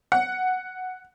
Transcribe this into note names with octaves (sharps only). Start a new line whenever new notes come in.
F#5